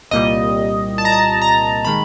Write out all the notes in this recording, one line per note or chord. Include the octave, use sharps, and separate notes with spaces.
C2 A#2 G3 D#5
A5
A#5
A5
A#5
D#3 G#3 B5